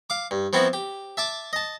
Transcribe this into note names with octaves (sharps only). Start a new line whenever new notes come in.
F5 D6
G2
F3 B3 C4 E4 F#4
G4
E5 A5 D6
D#5 A5